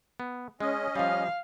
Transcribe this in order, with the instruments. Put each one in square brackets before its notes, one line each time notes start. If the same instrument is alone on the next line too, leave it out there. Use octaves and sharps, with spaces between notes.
[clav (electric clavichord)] B3
[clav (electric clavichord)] G#3 [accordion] C#4 D#5
[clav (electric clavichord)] F3 G3 [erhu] F5